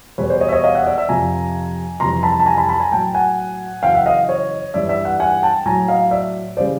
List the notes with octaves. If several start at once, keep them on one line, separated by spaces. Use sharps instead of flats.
E2 B2 G3 B4 C#5
C5 D5
C#5 D#5
E5
C#5 D#5
D#5 F5
E5 F#5
D5 E5
D5 E5
F2 C3 F3 G#5 A#5
F2 C3 E3 G3 A#5 C6
A5 B5
A5
G#5 A#5
A5 B5
A5 B5
G#5 A#5
A2 F#3 G5 A5
F#5 G#5
F#2 C#3 E3 F5 G5
E5 F#5
D#5 F5
C#5 D#5
G2 E3 G3 D5 E5
D5 E5
E5 F#5
F#5 G#5
G5 A5
A2 F#3 G#5 A#5
D#5 F5
D5 E5
C#3 E3 G3 C5 D5